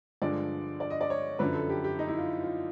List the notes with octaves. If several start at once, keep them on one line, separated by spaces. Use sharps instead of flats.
G2 D3 F3 G#3 D5
D5
D#5
D5
C#5
F#2 D3 F3 B4
A4
G4
G4
D#4
E4
F4
F4